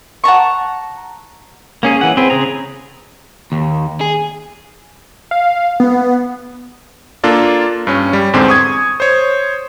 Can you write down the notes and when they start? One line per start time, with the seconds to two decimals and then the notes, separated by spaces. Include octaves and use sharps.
0.24 F#5 A5 A#5 C#6
1.83 A#3 C#4 G#4
2.01 E3 F#5
2.17 C4 G#4 B4
2.30 C#3 G#4 A#5
3.52 D#2
4.01 G#4
5.31 F5
5.80 B3
7.24 A#3 D4 F4 A4
7.87 G2 C#4
8.13 G3
8.33 E2 G#2 D3 C4
8.48 C#6 D#6 G#6
9.00 C5 C#5